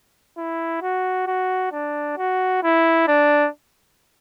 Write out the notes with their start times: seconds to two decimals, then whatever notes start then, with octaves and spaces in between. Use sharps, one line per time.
0.37 E4
0.82 F#4
1.27 F#4
1.72 D4
2.18 F#4
2.63 E4
3.08 D4